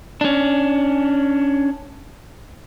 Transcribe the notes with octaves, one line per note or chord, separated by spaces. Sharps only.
C#4 D4